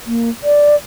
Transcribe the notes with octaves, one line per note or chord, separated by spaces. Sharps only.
A#3
D5